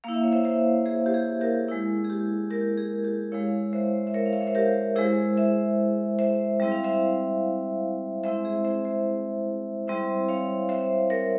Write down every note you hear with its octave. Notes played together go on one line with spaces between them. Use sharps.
A#3 E4 F5
E5
C#5
C5 E5
C5 E5
G#4 C5
G4
G#4
G4 A#4
G#3 E4 G#4
G#4
G4
G4 A#4
G#4
G4
G#3 E4 C#5 F5
C5 E5
E5
A#4 C#5
F5
E5
C#5
C5
G4 A#4
G#3 E4 G#4 C5
C5 E5
C5 E5
G3 C4 E4 E5
F5
C5 E5
G#3 C4 E4 C5 E5
G#4
C5 E5
C5 E5
G3 C4 E4 C5 E5
C#5 F5
C5 E5
A#4 C#5